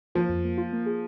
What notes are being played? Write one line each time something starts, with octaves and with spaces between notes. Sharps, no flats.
F3 A#3
F2
A#3
F4
A#3
G#4